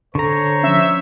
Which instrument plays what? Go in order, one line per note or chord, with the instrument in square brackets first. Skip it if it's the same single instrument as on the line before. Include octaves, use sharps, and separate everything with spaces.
[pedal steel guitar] D3 A#5 [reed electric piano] A4 C#6 [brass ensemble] C5 C#5
[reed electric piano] F3 C#4 [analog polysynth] E5